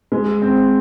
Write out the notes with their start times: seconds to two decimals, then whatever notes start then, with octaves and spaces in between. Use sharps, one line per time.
0.12 G#3
0.42 C4